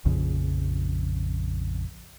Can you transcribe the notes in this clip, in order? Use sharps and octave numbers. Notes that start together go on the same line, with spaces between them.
A#1 F2 C#3